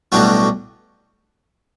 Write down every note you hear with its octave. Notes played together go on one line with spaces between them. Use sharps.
B1 A2 G3 D4 F#4